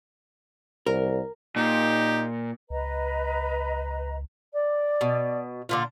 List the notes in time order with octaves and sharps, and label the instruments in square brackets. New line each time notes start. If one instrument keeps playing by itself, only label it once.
[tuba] C2 [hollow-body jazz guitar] A#4
[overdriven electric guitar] A#2 [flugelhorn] D#4 [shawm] G4
[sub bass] C#2 [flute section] B4 D#5 A#5
[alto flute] D5
[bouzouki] B2
A#2 D3 F4